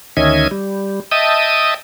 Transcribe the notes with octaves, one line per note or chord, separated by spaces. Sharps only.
D2 D#3 C#4 D#5 E5 G#6
G3
D#5 E5 G5 A5 D#6